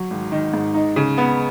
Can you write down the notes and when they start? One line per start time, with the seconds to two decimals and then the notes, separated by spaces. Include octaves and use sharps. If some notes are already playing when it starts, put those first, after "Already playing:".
Already playing: F#3
0.10 G#1
0.32 D#3
0.53 G#2
0.74 D#4
0.96 C#3
1.18 B3